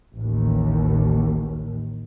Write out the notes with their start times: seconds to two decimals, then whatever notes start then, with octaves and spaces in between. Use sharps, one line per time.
0.16 A1 D#2